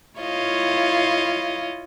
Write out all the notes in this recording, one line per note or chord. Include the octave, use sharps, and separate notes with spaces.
E4 F4 C#5 D#5 F5